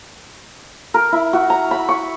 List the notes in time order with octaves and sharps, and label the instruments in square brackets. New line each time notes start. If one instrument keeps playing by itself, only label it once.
[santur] A#4
E4
F#4
A#5
B5
C#6